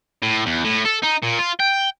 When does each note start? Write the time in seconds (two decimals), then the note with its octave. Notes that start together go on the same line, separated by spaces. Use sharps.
0.22 A2
0.46 E2
0.64 A2
0.85 A4
1.03 D#4
1.23 A#2
1.39 F4
1.60 G5